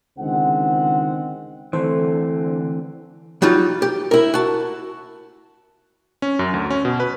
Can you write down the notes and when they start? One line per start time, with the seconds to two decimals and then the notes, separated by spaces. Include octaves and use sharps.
0.18 C#2 D3 D#3 G#3 C4 F#5
1.73 D3 E3 A3 C4 C5
3.42 F#3 G3 D#4 F4
3.82 G4
4.11 E4 A#4
4.34 F#4 A5
6.22 C#4
6.39 F#2
6.54 D2
6.70 C#4
6.85 B2
7.00 B4